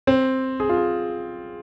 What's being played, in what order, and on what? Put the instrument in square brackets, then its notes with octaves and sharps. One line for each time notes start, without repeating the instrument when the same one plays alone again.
[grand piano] C4
G#4
F4
G#4